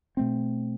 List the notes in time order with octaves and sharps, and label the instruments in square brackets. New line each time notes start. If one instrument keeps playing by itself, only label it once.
[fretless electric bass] B2 A3 C4